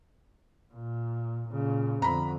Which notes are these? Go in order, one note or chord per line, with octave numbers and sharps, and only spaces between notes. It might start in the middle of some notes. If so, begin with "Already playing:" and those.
A#2
A#2 C#3
F2 D3 A#5 B5